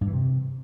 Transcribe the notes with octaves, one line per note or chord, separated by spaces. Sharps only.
G2
E3
C3